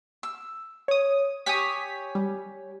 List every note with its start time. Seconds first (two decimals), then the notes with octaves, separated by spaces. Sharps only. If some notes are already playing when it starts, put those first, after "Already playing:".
0.23 E6
0.88 C#5 D#6
1.46 G4 C#5 G#5 D#6 B6
2.15 G3